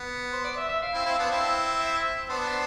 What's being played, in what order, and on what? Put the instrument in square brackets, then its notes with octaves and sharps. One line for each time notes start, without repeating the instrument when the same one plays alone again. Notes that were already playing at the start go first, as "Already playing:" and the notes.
Already playing: [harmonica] B3
[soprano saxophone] C5
D5
E5
E5
F5
[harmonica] C4 E4
C4 E4
B3 D4
C4 E4
[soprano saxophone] E5
[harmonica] B3 D4 [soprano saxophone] C5